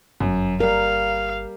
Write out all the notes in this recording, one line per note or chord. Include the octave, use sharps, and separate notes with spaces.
G1 F#2
G3 A#4 F5